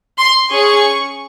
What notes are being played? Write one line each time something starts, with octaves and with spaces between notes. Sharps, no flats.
C6
C#4 G#4 C#6